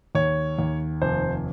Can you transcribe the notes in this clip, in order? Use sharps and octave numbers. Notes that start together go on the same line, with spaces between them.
D#2 C#5
D#2
F1 C5